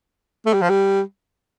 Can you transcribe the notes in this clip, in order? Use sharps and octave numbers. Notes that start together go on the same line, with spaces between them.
A3
G3
F3
G3